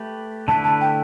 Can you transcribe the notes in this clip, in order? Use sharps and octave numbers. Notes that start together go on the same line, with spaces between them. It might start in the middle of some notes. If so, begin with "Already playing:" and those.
Already playing: A3 G4 B4
D3 A3 E4 B4 A5
A5
G5